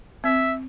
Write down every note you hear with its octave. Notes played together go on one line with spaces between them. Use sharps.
C4 E5